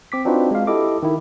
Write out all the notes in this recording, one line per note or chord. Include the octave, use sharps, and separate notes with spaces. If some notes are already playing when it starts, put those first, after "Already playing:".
C4 D6 B6
C4 D4 D#4 F4 F#4 B4
G#3 F5
E4 G4 A4 D#5 D6
D#3 E4